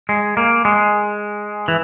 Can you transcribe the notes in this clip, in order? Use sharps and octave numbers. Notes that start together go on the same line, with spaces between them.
G#3
A#3
G#3
E3